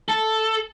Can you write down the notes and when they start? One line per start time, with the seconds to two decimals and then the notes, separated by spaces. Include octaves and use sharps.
0.09 A4